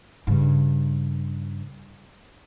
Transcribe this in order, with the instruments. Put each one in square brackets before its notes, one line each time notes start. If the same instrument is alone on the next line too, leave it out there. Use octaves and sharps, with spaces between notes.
[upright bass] G2 C#3